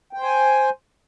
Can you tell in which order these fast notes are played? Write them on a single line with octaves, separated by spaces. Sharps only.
G5 C5 G#5